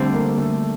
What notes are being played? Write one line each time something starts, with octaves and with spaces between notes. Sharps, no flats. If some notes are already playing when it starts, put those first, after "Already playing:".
Already playing: D3 G3 A3 C4
A#3
A3